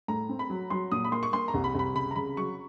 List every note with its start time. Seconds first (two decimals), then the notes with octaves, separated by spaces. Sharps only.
0.08 A2 A#5
0.29 C4
0.39 B5
0.50 F#3
0.70 F#3 C6
0.92 A#2 D#6
1.04 B5
1.12 A#3 C6
1.23 C#6
1.33 A#3 C6
1.48 A#5
1.54 C2
1.64 B5
1.75 C2 B5
1.95 C#3 B5
2.11 A#5
2.16 C#3 B5
2.37 F#3 C#6